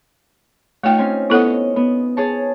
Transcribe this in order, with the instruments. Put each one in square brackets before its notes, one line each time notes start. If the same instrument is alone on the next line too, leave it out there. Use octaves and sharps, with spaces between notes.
[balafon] A3 G5 [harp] D#4 F4 C#5
[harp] C4 C#4 G#5
[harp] B3 C#5 D#5 [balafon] E4 A4 F#5
[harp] B3
G#4 C#5 A5